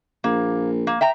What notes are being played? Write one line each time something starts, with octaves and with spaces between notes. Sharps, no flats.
A#1 A#3
A#3
E5 G5 A#5